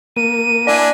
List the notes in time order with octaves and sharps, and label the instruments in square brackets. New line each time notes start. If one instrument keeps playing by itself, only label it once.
[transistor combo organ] A#3 [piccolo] D#7
[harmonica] D4 E4 G#5 [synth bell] D5